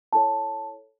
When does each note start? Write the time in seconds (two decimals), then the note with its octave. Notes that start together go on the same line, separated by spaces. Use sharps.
0.13 E4 A4 C#5 A5